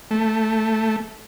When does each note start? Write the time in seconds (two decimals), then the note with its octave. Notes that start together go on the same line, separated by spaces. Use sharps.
0.11 A3